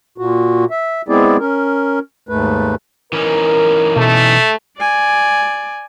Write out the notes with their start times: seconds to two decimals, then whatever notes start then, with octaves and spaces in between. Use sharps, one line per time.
0.18 A#2 F#4
0.71 E5
1.09 G#3 B3 C4 E4 G#4 D5
1.39 C#4 A#4
2.29 D#2 G#2 A3 B4
3.13 E3 C#4 D#4 A#4
3.97 B2 A3
4.78 D5 G#5